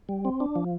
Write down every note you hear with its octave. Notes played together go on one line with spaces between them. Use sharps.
G3
C4
D4
F3